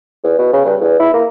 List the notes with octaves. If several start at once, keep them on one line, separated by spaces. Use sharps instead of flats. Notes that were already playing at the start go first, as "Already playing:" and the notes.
E2
B2
C#3
G2
E2
E4
A#3